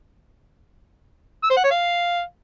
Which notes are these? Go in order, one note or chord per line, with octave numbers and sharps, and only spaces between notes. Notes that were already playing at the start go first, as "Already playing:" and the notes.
E6
C5
F#5
C#5
F5